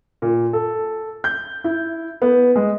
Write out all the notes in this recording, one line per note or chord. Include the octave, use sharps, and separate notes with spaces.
A#2
A4
G6
E4
B3
G#3